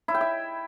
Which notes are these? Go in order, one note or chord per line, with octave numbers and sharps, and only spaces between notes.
E4
G5
E5